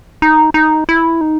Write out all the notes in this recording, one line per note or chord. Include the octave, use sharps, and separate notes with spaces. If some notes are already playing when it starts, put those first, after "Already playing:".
D#4
D#4
E4
D#4